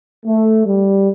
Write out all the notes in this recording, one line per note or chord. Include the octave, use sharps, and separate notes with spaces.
A3
G3